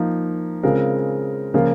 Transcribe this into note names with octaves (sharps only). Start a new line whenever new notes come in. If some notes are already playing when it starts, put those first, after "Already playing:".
Already playing: F3 A#3 D#4
C#3 G#3 C4 F4 A#4
C#3 F3 A#3 F4 A#4